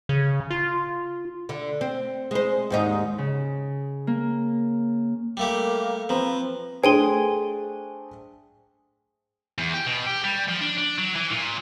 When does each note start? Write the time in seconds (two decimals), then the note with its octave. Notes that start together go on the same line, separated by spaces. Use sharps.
0.09 C#3
0.50 F4
1.49 D3
1.81 C4
2.31 G#3 C5
2.70 D#2 G#2 D#4
3.18 C#3
4.07 A#3
5.37 G3 A3 A#3 G4
6.09 F3 C4 B4 A#5
6.84 A3 D4 G#4 C5 G5 G#5 C6
9.58 E2
9.74 G4
9.86 B2
10.07 G4
10.24 G3
10.49 F3
10.61 D4
10.78 D4
10.98 F#3
11.16 E3
11.32 A#2